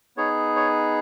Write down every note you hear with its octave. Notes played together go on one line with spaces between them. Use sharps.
B3 D#4 G#4 C#5
C#5